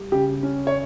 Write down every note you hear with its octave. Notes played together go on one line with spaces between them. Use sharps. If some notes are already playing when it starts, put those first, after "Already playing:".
Already playing: G3
C#3 G4
C#4
C#5